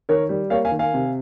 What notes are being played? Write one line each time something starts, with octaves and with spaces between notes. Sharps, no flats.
D#3 A#4 C#5
G3
A#3 C#5 F5
F5 G#5
D#3
F5 G#5
C3